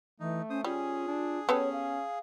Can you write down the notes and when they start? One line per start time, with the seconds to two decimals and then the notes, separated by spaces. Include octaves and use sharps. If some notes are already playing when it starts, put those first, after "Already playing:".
0.20 E3 A3 D#4
0.50 C#4 C5 D#6
0.64 G3 C#4 F4 G#4
1.07 D4
1.49 B3 C#4 G4 A4 C#5
1.73 F5